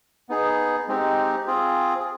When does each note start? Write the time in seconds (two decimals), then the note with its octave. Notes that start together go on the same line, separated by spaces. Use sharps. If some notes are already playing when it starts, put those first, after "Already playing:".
0.29 B3 D#4 G#4
0.88 G#3 C4 D#4 G4
1.47 C4 F4 G#4
2.00 G#4